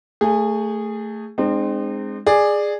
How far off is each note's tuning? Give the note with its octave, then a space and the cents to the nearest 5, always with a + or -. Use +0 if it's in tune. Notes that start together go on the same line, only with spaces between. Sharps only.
A3 +15 G#4 -15
G#3 +0 C4 +0 D#4 -45
G#4 -5 D5 +15